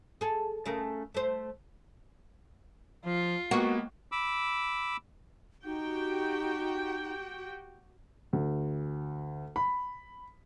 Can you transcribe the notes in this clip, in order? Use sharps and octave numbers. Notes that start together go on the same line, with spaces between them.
G#4 A4
C#3 A3 A#4
A3 C5
F3 F4
G#3 A#3 B3 F#4
B5 D6 E6
D#4 F#4 G4 G5
D2
B5